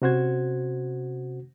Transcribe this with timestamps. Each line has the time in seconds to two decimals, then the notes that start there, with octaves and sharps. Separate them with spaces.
0.02 C3 C#4 F#4 C5 F#5 G#6